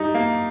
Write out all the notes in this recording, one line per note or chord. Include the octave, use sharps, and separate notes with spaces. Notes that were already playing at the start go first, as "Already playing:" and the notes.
Already playing: G3 D#4
A#3